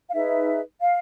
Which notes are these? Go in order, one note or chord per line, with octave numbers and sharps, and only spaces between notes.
F5
D#4 G#4 B4 E5
F5